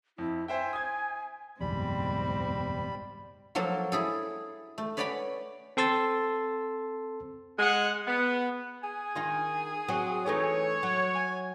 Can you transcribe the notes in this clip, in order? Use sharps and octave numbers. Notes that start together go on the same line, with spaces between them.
F2 E4
C5 E5 G5 G#5
D#6 G#6
F#1 B1 E2 G#2 G3 C4 B5
F3 F#3 A#3 A4
E4 G#4 A4
A3
B4 C#5 D5 F#5 G#5 B5
C4 A4 C6 E6 A6
G#3 G#4 F#5
B3
G#4 G#5
D#3 D#4 F4
F#3 C4
E3 A3 D#4 C#5
F#3
G#5